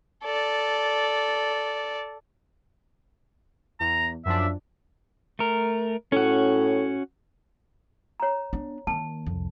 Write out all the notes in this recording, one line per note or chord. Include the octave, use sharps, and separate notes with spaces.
A4 D5
E2 A#5
F#2 F3 D4 E5
A3 A#4
A2 C#4 F#4
C#5 A#5
B3 D4
D#3 A#3 A5
C2 F2